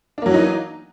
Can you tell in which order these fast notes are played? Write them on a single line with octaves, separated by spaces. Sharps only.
D4 A#3 F#3 E3 D#4